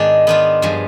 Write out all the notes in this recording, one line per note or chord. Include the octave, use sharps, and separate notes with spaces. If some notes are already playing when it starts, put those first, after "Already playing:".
Already playing: G#2 D#3 G#3 B3 D4
D#3 B3 D4 F4
G2 F3 G#3